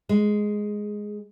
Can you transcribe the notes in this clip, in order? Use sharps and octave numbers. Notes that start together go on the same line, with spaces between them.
G#3